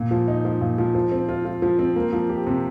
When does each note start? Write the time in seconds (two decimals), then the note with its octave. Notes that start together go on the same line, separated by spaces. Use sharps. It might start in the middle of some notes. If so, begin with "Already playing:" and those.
Already playing: A#2
0.11 F3
0.28 D#4
0.45 F3
0.61 A#2
0.78 F3
0.95 F3
1.12 C4
1.29 F4
1.45 F4
1.62 F3
1.79 C4
1.96 A#3
2.13 F3
2.29 G4
2.46 C3